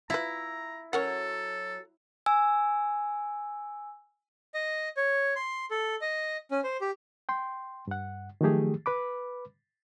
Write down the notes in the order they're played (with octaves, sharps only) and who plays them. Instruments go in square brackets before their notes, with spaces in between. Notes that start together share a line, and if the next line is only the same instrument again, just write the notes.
[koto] E4 [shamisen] F4 B4 [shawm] A#5
[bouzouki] F#3 C#5 [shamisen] C#4 A#4 F#5 [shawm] A4
[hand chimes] G#5 E6
[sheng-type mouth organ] D#5
C#5
C6
A4
D#5
C#4
C5
G4
[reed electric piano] G5 C6
G2 F#5
D#3 F3 F#3 A3 G4 G#4
B4 B5 D6